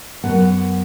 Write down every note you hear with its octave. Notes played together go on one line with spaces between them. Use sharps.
F#2 E3 B3 F#5